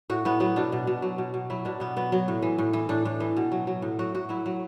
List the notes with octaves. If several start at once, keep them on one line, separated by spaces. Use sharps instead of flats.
A2 F#4
A2 B3
F#3 B3
B2 D4
B2
B2
F#3
B2
B2
F#3 E4
B2 D4
B2 B3
F#3 B3
F#3
A2
E3
A2
E3
A2 D4
A2
E3
B2
F#3
F#3
A2
F#3 F#4
A2 F#4
F#3 E4
F#3